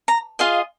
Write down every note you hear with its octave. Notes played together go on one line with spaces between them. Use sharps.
A#5
F4 G#4 D#5 F5